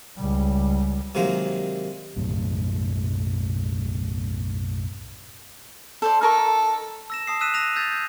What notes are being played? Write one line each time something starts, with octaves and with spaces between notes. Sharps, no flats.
C#2 G3
C3 D#3 F#3 G#3 A#3
B1 F#2 A2
A4 C5 D5
D#4 A4 A#4 C#6
E6 A#6 E7
A5 D#6 C7
E6 F#6 B6 D#7 E7
A#6 D#7 F7
E6 G6 A6
G6